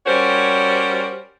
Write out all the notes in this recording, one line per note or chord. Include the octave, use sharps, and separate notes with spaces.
G3 C#4 F#4 A#4 C5 C#5